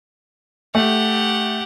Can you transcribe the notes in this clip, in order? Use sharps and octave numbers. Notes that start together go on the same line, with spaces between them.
A3 G4 F#5